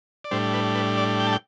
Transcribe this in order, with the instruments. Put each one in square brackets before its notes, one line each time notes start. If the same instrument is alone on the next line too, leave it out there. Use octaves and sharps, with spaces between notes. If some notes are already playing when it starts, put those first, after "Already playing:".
[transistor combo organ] D5
A2 G3 D4 C5
B4
B4
D5
G5
A5
G5